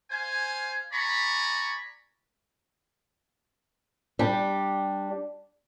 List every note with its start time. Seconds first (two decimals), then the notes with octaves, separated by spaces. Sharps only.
0.11 C5 F5 G#5
0.92 D5 G#5 A#5 B5 C#6
4.19 G3 D4 G4